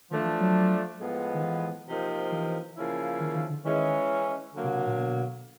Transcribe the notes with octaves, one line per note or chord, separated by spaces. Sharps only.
D#3 F3 A3 D4
E3
F#3
A2 F3 G#3 B3
D#3
E3
C3 F3 A#3 D#4
E3
C#3 F3 A#3 C#4 E4
D#3
D#3
D3
D#3 E3 G#3 C#4
D3 F#3 A#3
C3
C3
A#2
B2